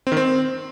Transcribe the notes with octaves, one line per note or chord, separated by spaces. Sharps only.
C4
D#3
C4